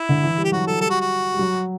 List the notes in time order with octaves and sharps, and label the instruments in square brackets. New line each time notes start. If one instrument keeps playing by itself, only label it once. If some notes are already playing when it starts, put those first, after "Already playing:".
Already playing: [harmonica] E4
[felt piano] D3
E3
G3
[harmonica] G4
[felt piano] F#3 [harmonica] F#4
[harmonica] A4
[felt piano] G3 [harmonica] A4
[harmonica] F#4
F#4
[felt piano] G3
F#3